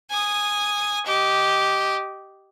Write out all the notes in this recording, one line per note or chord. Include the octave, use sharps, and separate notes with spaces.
G#5 D#6
G4 D#5